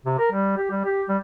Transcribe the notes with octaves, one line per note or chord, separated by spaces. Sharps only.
C3
A#4
G3
G4
G3
G4
G3